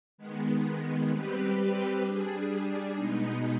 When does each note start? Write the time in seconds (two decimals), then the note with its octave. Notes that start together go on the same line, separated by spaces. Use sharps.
0.18 D#3 G#3 B3
1.10 G3 C4 G4 B4
2.02 G3 D4 G#4
2.94 B2 G#3 B3 D#4